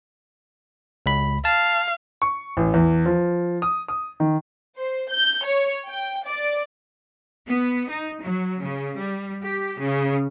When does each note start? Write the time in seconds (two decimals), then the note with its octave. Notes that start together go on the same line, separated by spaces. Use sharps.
1.06 C#2 B5
1.45 F5 A5
2.22 C#6
2.57 A1
2.74 E2
3.06 F3
3.62 D#6
3.88 D#6
4.20 D#3
4.78 C5
5.11 G6
5.45 C#5
5.87 G5
6.25 D5
7.47 B3
7.87 D#4
8.21 F#3
8.59 C#3
8.95 G3
9.42 G4
9.78 C#3